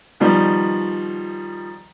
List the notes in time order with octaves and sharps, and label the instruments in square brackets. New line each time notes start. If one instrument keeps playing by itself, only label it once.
[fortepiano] B2 D#3 F3 G3